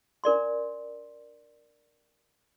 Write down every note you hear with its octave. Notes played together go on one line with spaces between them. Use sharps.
D4 A#4 D5 C6